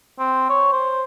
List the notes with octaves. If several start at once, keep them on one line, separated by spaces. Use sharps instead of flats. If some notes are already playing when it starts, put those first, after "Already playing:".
C4
C#5
C5